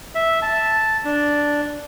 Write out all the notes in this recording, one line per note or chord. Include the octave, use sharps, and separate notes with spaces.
E5
A5
D4